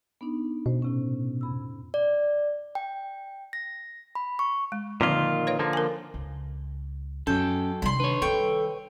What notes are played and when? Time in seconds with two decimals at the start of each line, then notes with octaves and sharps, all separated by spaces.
0.21 B3 D4 D#4
0.66 B2 C5
0.82 A2 C3 C#4
1.41 F2 B5 E6
1.94 D5
2.75 G5
3.53 A#6
4.15 B5
4.39 C#6
4.72 G#3
5.01 A#2 D3 D#3 F3 C4 F4
5.47 B4 C#5 F5
5.59 D3 F3 A#3
5.73 A#4 G#5
6.14 C#2
7.27 F#2 F#3 C#4 A4 G5
7.82 C3 D#3 G3 B5 C6
8.00 D4 B4 C#5
8.22 D#3 G3 A4 G5 C#6